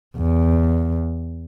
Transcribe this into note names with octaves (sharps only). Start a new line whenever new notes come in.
E2